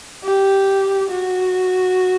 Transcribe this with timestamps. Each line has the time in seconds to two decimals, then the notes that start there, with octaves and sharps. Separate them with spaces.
0.24 G4
1.11 F#4